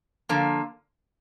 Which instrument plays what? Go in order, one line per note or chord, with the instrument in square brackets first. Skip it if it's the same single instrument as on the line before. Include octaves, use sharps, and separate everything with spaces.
[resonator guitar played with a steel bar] D3 F3 A#3